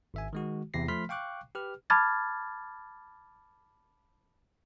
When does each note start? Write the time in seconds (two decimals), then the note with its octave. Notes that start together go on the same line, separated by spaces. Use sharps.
0.14 G#1 E5 G#5
0.33 D#3 G#3 F#4
0.74 E2 C3 E4 G4 A#6 C7
0.88 F3 A3 B5 C6 F6 B6
1.09 F5 G5 C#6 D6 F#6
1.55 G4 B4 F6
1.90 A5 B5 D6 F6 G#6 A6